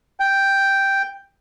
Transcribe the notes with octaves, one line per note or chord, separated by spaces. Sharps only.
G5